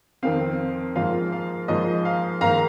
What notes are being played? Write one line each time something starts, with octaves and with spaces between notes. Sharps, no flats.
F2 D#3 C4 F5
G#2 F3 A#3 F4 F5
F5
G#2 F3 A#3 F4 D#5
F5
G#2 D#3 A#3 F5 A#5